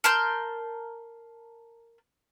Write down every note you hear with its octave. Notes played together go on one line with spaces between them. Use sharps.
A#4 A5 C6 G6